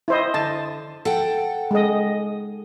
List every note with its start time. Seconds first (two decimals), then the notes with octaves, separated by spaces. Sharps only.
0.08 E4 C5 D#5
0.34 D3 A5
1.05 A4 F#5 G5
1.71 G#3 D#5